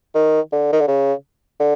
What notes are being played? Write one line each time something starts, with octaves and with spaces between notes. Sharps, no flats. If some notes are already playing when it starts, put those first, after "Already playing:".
D#3
D3
D#3
D3
C#3
D3